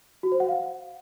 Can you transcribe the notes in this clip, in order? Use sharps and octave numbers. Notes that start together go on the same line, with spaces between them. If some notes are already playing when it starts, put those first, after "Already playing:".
F#4
C5
F#5
F5